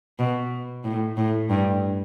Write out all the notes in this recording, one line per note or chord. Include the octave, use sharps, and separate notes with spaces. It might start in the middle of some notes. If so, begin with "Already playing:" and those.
B2
A2
A2
G2